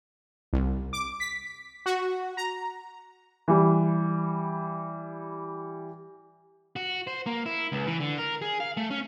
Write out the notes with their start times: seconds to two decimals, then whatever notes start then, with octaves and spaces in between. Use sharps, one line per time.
0.53 C2
0.93 D6
1.20 B6
1.86 F#4
2.37 A#5
3.48 E3 G3
6.76 F#4
7.07 C5
7.26 A#3
7.46 E4
7.72 C#2
7.87 E3
8.00 D3
8.18 A#4
8.42 G#4
8.60 F5
8.77 A3
8.91 C#4